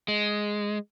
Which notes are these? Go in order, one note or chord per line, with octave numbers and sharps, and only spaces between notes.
G#3